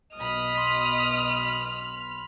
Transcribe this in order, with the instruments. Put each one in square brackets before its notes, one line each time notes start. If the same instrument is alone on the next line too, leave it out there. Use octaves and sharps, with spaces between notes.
[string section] B1 B2 B5 [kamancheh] D#5 D#6 [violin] F6
[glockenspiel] C6 B6